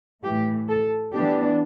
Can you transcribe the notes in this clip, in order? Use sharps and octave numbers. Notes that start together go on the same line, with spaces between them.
A2 E3 A3 G4
A4
E3 B3 D4 G4